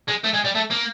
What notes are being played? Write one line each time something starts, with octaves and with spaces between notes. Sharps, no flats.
G#3
A3
G#3
G3
A3
A#3